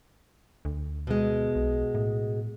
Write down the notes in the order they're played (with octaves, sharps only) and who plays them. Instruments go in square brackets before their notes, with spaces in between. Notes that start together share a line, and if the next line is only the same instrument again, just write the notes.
[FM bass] D2
[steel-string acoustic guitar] B2 G#3
[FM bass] B1
A2